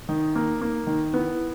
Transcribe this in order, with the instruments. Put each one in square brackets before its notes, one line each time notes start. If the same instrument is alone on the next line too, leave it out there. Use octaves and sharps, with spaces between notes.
[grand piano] D#3 [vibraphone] D#4
[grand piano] A#3
A#3
D#3
[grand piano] B3 [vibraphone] E4